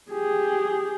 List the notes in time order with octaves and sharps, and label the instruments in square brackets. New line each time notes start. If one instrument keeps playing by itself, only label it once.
[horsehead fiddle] G4 G#4